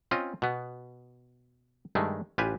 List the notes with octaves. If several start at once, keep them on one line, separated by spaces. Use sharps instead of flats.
C4 C#4 F4 D#5
B2 B3
G2 D#3 G#3 A3
A1 F4 G4 B4 G#5